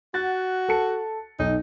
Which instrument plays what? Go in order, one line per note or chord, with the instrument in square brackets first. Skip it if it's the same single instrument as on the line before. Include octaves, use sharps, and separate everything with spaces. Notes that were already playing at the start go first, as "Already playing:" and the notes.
[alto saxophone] F#4 [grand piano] F#5 F#6 A6
[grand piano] A4 A5 C#7
[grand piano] B1 [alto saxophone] D#4